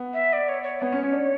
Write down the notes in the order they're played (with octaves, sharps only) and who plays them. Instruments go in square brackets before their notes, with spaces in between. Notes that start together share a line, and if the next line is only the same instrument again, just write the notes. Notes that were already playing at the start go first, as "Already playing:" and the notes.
Already playing: [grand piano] B3
[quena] E5
D5
C#5
C#5
D5
[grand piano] B3 [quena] C#5
[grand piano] C#4
C#4
D4